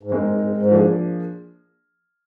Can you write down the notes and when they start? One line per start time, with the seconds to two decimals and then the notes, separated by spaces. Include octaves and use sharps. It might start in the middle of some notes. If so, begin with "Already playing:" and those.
0.03 G#2
0.11 G2 G#3 C4 D#4 A#4
0.27 G#2
0.41 G#2
0.57 G#2
0.72 F3 A#3 D4 G#4 D5